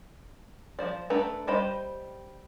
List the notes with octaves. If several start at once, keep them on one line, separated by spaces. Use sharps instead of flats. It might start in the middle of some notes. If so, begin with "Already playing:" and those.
F3 C5 D5
A3 D4 A4 B4 A#5
G3 G4 C5 D#5 B5